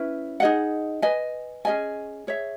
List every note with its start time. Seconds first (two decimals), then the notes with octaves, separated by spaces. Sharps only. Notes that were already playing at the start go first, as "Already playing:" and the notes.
Already playing: C#4 E4 B4
0.40 D#4 G#4 D#5 F#5
1.02 B4 D#5 G#5
1.65 C#4 G#4 D#5 G#5
2.27 G#4 C#5 E5